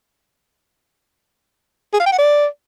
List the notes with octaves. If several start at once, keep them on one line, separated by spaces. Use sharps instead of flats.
G#4
F5
G5
F#5
D5